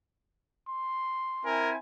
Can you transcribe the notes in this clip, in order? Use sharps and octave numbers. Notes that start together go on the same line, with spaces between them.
C6
C4 E4 A#4 G#5